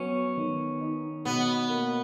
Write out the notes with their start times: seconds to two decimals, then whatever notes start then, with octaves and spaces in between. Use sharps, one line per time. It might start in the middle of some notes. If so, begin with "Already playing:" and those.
Already playing: F#3 B3 C#4
0.37 D#3
0.81 D#4
1.25 B2 B3
1.70 A#3